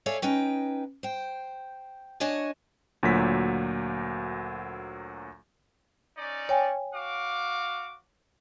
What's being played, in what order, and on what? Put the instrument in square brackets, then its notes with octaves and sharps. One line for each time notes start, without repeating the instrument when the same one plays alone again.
[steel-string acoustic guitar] A4 C#5 D5 E5 F5 G#5
C#4 D#4 B4 G5
C5 G5
D4 F#4 C#5 D#5 G#5 A5
[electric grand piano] D2 A#2 F#3 A#3 F#5 B6
[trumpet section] C#4 D#4 D5
[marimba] C#5 G5 G#5
[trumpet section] F#4 F5 D6